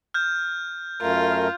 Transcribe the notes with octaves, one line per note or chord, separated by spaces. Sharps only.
F6 G6
F#2 A3 F4 A#4